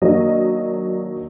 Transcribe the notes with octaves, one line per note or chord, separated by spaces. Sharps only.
D#3 F#3 A#3 D4 D#5